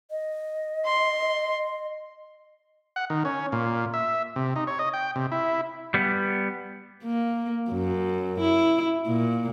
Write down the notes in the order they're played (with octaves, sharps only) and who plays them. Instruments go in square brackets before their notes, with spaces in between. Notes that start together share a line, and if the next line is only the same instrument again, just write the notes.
[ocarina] D#5
[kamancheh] C6
[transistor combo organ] F#5
D#3
C#4
A#2
E5
C3
D#4
C#5
D#5
G5
C3
E4
[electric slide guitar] G3 B3
[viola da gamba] A#3
F#2
E4
A#2